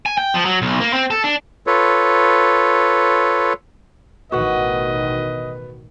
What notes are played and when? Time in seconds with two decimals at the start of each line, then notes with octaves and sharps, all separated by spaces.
0.06 G#5
0.18 G5
0.34 F3
0.45 F#3
0.62 B1
0.80 A#3
0.93 C4
1.11 A4
1.24 D4
1.67 F4 A4 B4 C#5
4.32 A1 B2 D#3 F#4 B4 D#5 F#5